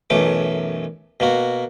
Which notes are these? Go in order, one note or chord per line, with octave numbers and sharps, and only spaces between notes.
B1 F#2 E3 A3 D6
B2 A#3 F#4